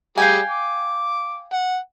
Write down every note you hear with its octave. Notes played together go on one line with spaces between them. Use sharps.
G3 G#4 F5 G5 G#5
D6
F#5